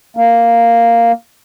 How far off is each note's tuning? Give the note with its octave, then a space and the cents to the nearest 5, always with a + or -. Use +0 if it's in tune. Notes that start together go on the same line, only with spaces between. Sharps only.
A#3 -5